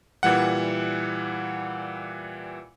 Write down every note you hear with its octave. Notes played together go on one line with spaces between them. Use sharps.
A#2 E3 G3 F#5